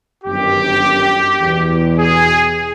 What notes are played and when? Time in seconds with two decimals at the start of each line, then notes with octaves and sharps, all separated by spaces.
0.24 G1 F#2 D#3 G4
1.39 E2 B2
1.96 G#4